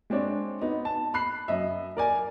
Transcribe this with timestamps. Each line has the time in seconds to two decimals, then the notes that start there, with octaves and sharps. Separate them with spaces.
0.10 G#3 C4 D4 C#5 D5
0.61 B3 D#4
0.85 A5
1.14 B5 F#6 C7
1.48 F#2 D#5 E5
1.97 A#4 D5 G#5